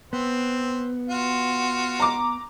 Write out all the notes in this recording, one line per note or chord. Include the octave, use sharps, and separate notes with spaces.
B3 C4
F4 F#4
A#5 D6